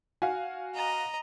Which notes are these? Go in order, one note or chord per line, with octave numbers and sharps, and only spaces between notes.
F#4 F5 G#5
D#5 A#5